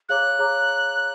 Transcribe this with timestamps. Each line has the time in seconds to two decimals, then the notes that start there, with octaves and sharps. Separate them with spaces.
0.09 G#4 C#5 F5 A#5 D6 F#6
0.39 G#4 C#5 F5 A#5 D6